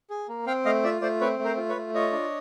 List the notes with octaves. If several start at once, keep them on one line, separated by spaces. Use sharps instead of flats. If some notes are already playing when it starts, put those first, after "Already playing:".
G#4
A#3
C4 F5 G5
A3 D#5 F5
F4 D5 E5
A3 C5 D5
C4 B4 C#5
A3
A#4 C5
F4
B4 C#5
A3
F4 C#5 D#5
D4